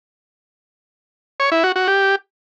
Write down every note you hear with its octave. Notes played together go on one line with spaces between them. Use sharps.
C#5
E4
F#4
F#4
G4